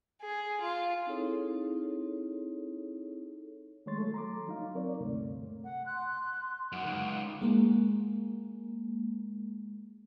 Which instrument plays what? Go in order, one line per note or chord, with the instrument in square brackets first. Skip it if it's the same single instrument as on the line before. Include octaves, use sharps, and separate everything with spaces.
[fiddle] G#4
F4
[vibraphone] C4 D#4 E4 G#4 A4 C#5
[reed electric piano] D#3 G#3 A3 C#5 C6 A6
F#3 A3 A4
A#5 C6 D6
F#3 D#4 F5
C4 A#4 C#5 D5
D2 G2 C3 A3
[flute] F#5
[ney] C6 [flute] F#6
[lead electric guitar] F#2 [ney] D#4 [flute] F#5
[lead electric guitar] C#2
[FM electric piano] G#3 A#3